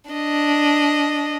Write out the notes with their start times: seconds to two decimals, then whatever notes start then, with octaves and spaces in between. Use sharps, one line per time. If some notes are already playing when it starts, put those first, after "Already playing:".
0.11 D4 D#5